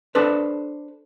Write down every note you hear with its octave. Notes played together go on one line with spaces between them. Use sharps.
D4 A4 B4 C5